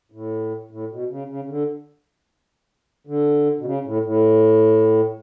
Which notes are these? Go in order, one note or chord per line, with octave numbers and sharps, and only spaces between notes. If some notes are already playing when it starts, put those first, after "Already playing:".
A2
A2
B2
C#3
C#3
C#3
D3
D3
B2
C#3
A2
A2